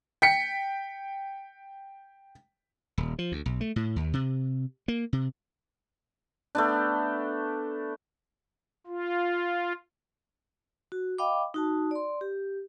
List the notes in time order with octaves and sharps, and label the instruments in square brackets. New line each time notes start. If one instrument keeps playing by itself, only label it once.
[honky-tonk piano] G5 B6 C#7
[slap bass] D#1
F3
D2
B1
A3
A2
D#2
C3
A#3
C3
[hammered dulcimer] A3 B3 D4
[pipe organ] F4
[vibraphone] F#4
D#5 F5 G5 B5 D6
D#4 F#4 A5
D5 C6
G4